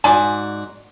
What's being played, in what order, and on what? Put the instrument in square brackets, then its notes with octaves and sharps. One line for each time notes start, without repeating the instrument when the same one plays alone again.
[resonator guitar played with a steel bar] G#2 [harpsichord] F#4 D5 [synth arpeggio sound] G#5